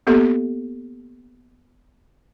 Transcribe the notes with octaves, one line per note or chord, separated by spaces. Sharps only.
A#3 B3 G4 A4